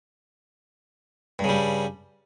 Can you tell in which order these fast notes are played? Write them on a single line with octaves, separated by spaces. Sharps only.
G2 C#3 G3